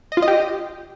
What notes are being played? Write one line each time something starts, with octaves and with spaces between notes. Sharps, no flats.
D#5
F4
D#5
G4